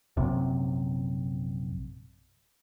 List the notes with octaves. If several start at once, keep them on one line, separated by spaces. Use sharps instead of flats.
A#1 F#2 C3